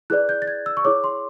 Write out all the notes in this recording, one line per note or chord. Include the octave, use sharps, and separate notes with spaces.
E4 G#4 B4 D5 F#6
G6
A6
G#6
E6
C#6
E4 G#4 C#5 D6
C6